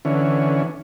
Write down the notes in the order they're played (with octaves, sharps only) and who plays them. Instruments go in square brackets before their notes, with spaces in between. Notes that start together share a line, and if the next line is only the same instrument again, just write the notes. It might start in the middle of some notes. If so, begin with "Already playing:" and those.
[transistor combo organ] D3 E3 C#4